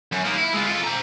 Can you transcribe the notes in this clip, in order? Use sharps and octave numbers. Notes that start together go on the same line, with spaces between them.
F#2
A#3 D#4
E4
G#3 F4
F4 A4
C5 A#5